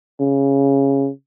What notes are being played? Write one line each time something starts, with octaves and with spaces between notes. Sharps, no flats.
C#3